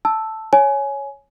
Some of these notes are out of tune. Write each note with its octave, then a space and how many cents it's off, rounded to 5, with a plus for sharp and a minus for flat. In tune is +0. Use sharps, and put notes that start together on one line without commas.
A5 +0 E6 +0
C#5 +0 G#5 +15